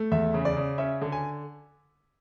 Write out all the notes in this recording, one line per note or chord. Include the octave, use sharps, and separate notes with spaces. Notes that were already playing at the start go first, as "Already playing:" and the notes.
Already playing: A3
E2 E5
C#3
D5
C#3
C#4 E5
D3
G#5